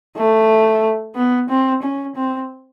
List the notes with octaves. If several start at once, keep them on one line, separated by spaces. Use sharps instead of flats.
A3
B3
C4
C#4
C4